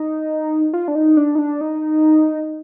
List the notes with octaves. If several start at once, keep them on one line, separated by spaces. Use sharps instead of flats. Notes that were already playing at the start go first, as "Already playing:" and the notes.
Already playing: D#4
F4
D4
D#4
D4
D#4
D4
D#4